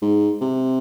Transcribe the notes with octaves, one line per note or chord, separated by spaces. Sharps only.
G#2
C3